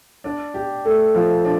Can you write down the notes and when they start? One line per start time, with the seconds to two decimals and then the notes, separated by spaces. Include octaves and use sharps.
0.24 D4
0.54 G4
0.85 A3
1.14 F3
1.45 D4